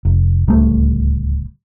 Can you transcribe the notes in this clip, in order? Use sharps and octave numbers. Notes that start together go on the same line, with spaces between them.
F1
D1 C#2 G3 A3